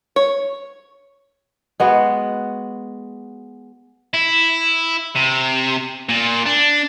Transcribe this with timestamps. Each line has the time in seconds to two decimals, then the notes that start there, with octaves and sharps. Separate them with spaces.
0.16 C#5
1.80 G#3 B3 F#4
4.14 E4
5.16 C3
6.09 A#2
6.46 D4